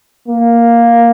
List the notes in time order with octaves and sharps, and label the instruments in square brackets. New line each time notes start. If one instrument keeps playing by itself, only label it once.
[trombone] A#3